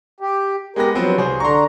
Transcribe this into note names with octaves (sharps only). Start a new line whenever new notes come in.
G4
G#3 B3 G4 A#4 A#6
G2 F3 F#3 B3 C4
C2 G#4 C5
D3 D4 A#5 C6 C#6